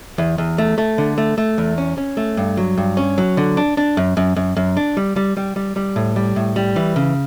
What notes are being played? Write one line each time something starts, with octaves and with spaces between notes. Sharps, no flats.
E2
E2
A3
A3
D3
A3
A3
E2
C#4
C#4
A3
G2
F#3
G2
C#4
F#3
D3
D4
D4
F#2
F#2
F#2
F#2
D4
G3
G3
G3
G3
G3
A2
G3
A2
G3
E3
C#3